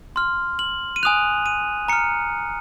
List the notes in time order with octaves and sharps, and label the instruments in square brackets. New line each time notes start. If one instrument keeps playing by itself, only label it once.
[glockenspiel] C6 F6
F#7
D#7
G#5 D#6 F#6 F7
D#7
A#5 F6 C#7